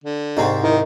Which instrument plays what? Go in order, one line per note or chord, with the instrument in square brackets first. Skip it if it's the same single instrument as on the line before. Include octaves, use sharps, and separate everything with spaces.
[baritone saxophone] D3
[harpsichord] C2 G#2 C4 [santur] D#4 A#5 C#6
[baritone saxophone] D#3 [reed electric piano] E4 A#4 D#5